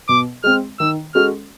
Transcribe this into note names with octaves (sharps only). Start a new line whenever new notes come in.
B2 D6
G#3 C4 F6
D#3 E6
G#3 C#4 F#4 A4 F6